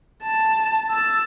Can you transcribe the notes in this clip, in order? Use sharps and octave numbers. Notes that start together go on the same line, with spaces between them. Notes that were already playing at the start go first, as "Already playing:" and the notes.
A5
E6 A6